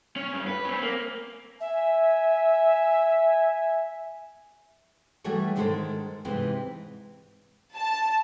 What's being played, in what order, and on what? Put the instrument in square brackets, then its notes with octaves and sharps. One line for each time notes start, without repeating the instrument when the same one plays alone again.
[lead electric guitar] C#4
G2
B4
C4 C#4
A#3
[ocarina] E5 [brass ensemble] G#5
[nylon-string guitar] E3 G3 A3 F#4 G#4 C#5
G#2 D#3 G#3 D4 A4 C5
G#2 C3 E3 G#3 C4 E4
[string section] A5